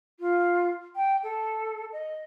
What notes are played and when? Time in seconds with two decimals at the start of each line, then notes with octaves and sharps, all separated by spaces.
0.20 F4
0.96 G5
1.23 A4
1.92 D#5